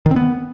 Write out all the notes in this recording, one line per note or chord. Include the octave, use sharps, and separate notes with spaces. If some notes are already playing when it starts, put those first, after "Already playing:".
D#3
C4
B3